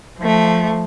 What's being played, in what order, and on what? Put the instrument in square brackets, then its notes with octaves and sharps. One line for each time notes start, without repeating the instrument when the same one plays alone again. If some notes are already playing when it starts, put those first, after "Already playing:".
[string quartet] F3 A3